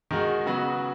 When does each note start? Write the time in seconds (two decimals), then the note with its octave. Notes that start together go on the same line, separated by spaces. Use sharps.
0.11 D#3 G#3 D#4 F#4
0.46 C#3 F#3 B3 F#4